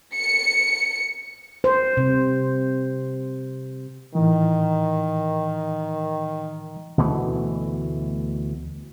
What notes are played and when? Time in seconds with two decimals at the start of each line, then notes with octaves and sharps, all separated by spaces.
0.15 C#7
1.64 C5
1.97 C3
4.15 A2 D#3 E3
6.98 D2 B2 E3 A3